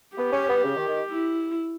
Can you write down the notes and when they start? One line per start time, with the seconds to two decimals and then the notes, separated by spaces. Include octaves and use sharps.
0.17 B3 G4
0.32 C#4
0.49 B3
0.64 C#3
0.76 D#3
0.88 D#3
1.11 E4